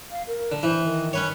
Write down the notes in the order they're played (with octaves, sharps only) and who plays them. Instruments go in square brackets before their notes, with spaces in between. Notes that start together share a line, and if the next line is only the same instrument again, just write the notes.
[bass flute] F5
A#4
[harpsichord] D3
[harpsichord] E3 [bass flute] C5
[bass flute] D#3
[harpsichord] C#4 B4 C#5